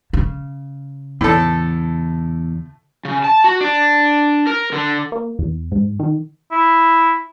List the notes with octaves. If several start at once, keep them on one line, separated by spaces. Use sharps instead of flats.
C#3
E2 A2 A4
C#3
A5
F#4
D4
A#4
D3
A#3
E2
G#2
D#3
E4